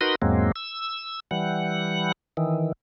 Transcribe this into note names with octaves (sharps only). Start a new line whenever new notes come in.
D#4 F#4 A#4 B4 C6 D#6
E2 G#2 F#3 G#3 A#3 C4
E6
E3 G3 F#5
D#3 E3